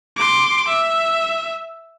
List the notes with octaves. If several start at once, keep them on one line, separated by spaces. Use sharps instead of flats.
C6 D6
E5